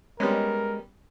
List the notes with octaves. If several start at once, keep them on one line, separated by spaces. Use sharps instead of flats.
G3 G#3 B3 C#4 A#4